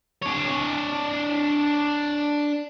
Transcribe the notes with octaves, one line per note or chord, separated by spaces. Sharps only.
D4 C#5